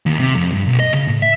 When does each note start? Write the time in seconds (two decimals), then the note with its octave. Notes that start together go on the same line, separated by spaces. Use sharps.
0.06 D#2
0.19 C3
0.35 F2
0.53 G2
0.66 B1
0.80 D#5
0.93 C#3
1.08 A2
1.22 E5